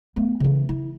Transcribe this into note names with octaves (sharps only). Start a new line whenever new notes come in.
A3 B3
C#3 E3
E4